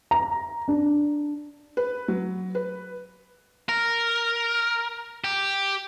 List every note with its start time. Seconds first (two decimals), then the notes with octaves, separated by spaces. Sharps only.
0.11 A#5
0.68 D4
1.77 B4
2.08 F#3
2.55 B4
3.69 A#4
5.24 G4